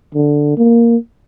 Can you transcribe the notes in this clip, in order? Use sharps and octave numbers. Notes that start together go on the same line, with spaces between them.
D3
A#3